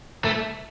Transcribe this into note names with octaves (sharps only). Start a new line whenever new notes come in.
A3